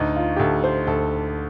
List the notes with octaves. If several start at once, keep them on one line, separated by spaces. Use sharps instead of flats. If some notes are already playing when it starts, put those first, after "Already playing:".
Already playing: D2 D#4
F4
G4
D2 A4
C5
D2 A4